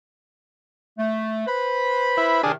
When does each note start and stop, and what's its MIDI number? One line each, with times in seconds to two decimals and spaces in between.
0.98 1.43 57
1.47 2.42 71
1.47 2.42 72
1.47 2.42 83
2.17 2.42 64
2.43 2.53 45
2.43 2.53 48
2.43 2.53 51
2.43 2.52 62
2.43 2.52 68